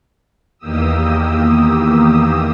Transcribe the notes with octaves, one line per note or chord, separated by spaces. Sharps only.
E2 D#3 A#3 G4 D#6 E6